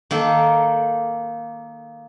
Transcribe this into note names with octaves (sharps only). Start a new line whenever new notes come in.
D#3 A#3 A4